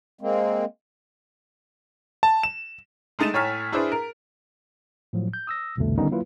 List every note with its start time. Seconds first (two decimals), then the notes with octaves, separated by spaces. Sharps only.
0.21 G#3 A#3 C4
2.23 A5
2.43 E7
3.19 G#3 A3 D#4 A6 D#7 E7
3.34 A2 C#5 G#5 A#5 F6 B6
3.72 D4 E4 G#4 B4 C5
3.92 A#4
5.13 A2 F3 F#3
5.34 G6
5.47 D#6 E6 A#6
5.77 C2 F2 B2 D3 A3
5.98 D3 D#3 G3 B3 C#4 D#4
6.11 F#3 A#3 E4 F4 B4